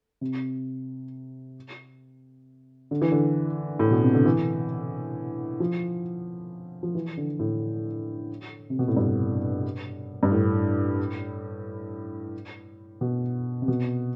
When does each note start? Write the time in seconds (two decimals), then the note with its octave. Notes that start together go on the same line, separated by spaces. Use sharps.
0.21 C3
2.91 D3
3.02 E3
3.12 D3
3.79 A2
3.91 B2
4.02 C3
4.14 D3
4.25 E3
5.60 F3
6.83 F3
6.95 E3
7.17 D3
7.39 A2
8.70 C3
8.79 B2
8.88 A2
8.97 G2
10.23 G2
10.32 A2
13.01 B2
13.62 C3
13.68 B2